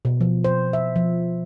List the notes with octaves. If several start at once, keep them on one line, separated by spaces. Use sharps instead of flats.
B2
F3
C5
E5
F3